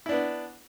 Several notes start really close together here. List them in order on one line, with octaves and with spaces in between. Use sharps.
E4 D4 B3